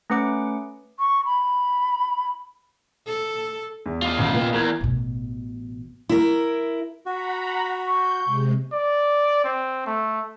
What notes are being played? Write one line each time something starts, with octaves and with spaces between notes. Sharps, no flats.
A3 C#4 B4 F#5 D6
C#6
B5
A4
E2
F4 D#5
A1 A3
A#2 B3
E2 A#4 G#6
A1 B2
E4 A#4
F#4 F#5 A#5 B5
C#6 G6
C3 G#3
D5
C4
A3